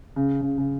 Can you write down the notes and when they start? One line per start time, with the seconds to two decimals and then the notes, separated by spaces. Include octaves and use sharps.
0.16 C#3
0.41 C#3
0.58 C#3